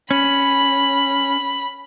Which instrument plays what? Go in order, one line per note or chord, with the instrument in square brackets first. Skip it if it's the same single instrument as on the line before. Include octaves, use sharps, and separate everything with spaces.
[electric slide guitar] C#4 [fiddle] B5